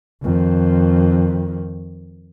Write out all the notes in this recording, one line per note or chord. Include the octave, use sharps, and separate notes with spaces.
F2 D#3